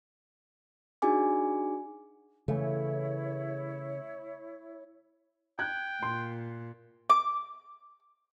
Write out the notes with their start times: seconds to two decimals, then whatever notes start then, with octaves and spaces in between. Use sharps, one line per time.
1.02 D4 D#4 F#4 G#4 G#5 D6
2.48 C#3 E3 A3 E4 C#5
5.59 G5 F#6 G#6
6.02 A#2 C6
7.10 D6